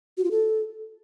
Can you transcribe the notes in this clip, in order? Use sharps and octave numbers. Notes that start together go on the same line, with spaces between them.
F#4
F4
A4